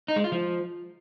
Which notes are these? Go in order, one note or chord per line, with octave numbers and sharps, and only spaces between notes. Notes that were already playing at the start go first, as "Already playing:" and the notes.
D#4
G#3
F4
F3